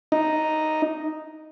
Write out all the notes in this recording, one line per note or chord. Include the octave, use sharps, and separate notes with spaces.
D#4